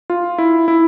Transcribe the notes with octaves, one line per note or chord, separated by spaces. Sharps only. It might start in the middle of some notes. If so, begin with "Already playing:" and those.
F4
E4
E4